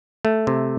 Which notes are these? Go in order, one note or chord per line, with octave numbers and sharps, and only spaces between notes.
A3
C3